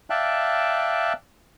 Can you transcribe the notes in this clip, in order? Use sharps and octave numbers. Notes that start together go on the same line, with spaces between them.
D5 E5 F5 G5 A5 F#6